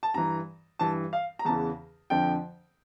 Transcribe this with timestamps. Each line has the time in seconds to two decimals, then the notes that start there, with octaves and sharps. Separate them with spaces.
0.03 A5
0.14 G2 E3 A#5
0.79 G2 E3 A5
1.13 F5
1.39 A#5
1.45 E2 C#3 E3 A5
2.10 F2 D3 F3 G5